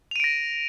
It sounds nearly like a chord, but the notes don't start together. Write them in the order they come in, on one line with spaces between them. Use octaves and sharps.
F7 D#7 D7 A#6